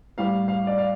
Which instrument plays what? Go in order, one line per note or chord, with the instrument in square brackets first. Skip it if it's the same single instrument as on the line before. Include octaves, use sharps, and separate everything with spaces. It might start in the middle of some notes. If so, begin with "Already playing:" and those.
[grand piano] A2 G3 F5
F5
D5
F5